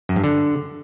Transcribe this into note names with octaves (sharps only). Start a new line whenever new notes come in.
F#2
G2
D3